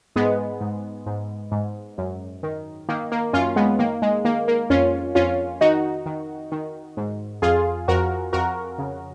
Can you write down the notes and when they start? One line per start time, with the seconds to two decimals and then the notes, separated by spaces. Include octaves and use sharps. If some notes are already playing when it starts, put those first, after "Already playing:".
0.16 G#2 G#3 B3
0.61 G#2
1.06 G#2
1.52 G#2
1.98 F#2
2.43 D#3
2.89 D#3 A#3
3.12 A#3
3.33 F#2 C#4 F4
3.56 G#3 B3
3.79 D#3 A#3
4.02 G#3
4.25 D#3 A#3
4.48 A#3
4.70 F2 C#4 F4
5.15 F2 C#4 F4
5.61 D#3 D#4 F#4
6.06 D#3
6.52 D#3
6.97 G#2
7.42 F2 F4 G#4
7.88 F2 F#4 A#4
8.33 F2 F#4 A#4
8.79 C#3